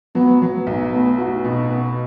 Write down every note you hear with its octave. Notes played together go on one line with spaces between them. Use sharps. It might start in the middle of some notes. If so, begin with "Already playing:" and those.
F#3 B3
F#3
B1
A3 B3
F#4
B2
B3